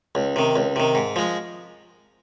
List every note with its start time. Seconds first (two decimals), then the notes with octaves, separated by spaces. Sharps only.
0.15 C#2
0.36 C3 D#3
0.56 C#2
0.76 C3 D#3
0.95 G#2
1.16 F3 G#3